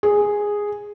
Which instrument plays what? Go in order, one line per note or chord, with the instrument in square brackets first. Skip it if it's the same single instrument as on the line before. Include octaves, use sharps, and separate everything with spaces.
[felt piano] G#4